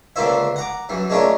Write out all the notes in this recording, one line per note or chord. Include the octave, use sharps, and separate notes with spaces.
C#2 D3 A#3 F4 C5 E5
F#5 A#5 D6
F#2 E3
G#3 A3 C#4 D4 F4 A#4